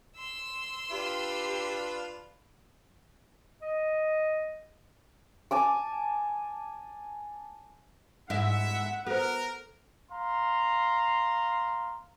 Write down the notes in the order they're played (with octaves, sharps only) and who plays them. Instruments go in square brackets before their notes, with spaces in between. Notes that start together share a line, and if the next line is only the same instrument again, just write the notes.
[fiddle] C6 E6
[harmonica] D4 F4 B4 [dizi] G4
[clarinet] D#5
[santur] G#5 A5 D6
[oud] G#2 E4 [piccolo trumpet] E5 [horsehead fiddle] F#5
[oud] B3 F#4 [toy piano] A4 C5 [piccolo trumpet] A#4
[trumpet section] F5 A#5 C6